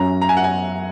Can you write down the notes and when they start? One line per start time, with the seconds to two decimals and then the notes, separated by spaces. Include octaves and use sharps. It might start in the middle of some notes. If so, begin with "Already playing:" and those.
Already playing: F#2 F#3 C#4 F#4 A#5
0.22 A#5
0.29 G#5
0.37 F#5
0.44 G#5